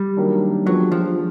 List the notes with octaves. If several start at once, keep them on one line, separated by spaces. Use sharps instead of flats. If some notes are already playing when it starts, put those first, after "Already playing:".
Already playing: G3
D#3 F#3 A#3 D4
F3 F#3 G#3 B3 D4 G4
F3